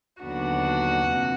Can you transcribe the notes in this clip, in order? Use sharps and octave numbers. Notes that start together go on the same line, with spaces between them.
D#2 D3 F#3 B3 D4 F#4
F2 C3 F3